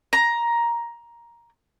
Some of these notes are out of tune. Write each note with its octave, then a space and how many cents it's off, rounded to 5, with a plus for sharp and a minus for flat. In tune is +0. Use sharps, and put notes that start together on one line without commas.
A#5 +10